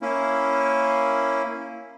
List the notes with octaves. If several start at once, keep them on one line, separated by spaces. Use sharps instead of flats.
A#3 C#4 E4